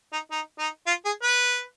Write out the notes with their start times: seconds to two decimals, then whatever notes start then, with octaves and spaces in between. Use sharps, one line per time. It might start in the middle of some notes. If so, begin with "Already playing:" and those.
0.12 D#4
0.31 D#4
0.59 D#4
0.87 F4
1.05 G#4
1.23 B4